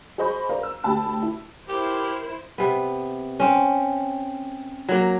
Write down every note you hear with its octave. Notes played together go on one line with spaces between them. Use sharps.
G#4 C5 D#5 B5 C#6 G6
A#4 C5 D5 F5 A#5
E6
D2 G4 G5 A5 B5 E6
E4
E4 G4 A#4 C5
C3 B3
C4 C#4
F#3 A#3